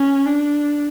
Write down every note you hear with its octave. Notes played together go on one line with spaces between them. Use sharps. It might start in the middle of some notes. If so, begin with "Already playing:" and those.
Already playing: C#4
D4